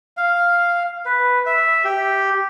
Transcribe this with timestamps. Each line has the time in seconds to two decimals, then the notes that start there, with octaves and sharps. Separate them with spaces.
0.17 F5
1.05 B4
1.46 E5
1.85 G4